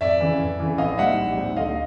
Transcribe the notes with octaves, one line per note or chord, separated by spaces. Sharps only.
F2 D5 E5
C#3 E3
F2
C#3 E3
A#1 D#5 F5
A#2 G3 C4 D#4 E5 F#5
A#1
A#2 G3 C4 D#4
D2 D#5 F5